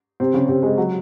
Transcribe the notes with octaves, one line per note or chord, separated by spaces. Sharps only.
C3 C4
C#3 C#4
C3 C4
G#3
F#3